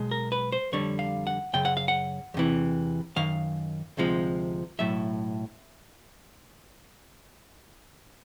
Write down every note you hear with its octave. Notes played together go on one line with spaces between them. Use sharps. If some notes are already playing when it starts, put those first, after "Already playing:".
Already playing: B1 B2 G#3
A#4
B4
C5
F2 D3 G3 C#5
F5
F#5
F#2 C#3 G5
F#5
F5
F#5
E2 C3 E3
F#2 D#3 F5
D2 C3 F3 G#3
B1 A2 F#3 E5